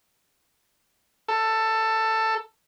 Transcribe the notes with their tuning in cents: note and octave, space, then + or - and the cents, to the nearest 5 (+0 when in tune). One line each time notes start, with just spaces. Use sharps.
A4 +15